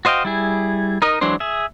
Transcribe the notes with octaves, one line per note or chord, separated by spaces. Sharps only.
F#4 C5 D#5 F5 G5
G3 E4 G#4
D#4 A#4 D#5
E3 F#3 G#3 D4 C5
G#4 E5